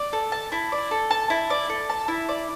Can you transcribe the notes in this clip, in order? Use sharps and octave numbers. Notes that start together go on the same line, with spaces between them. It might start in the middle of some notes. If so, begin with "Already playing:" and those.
Already playing: D5
A4
A5
E4
D5
A4
A5
E4
D5
A4
A5
E4
D5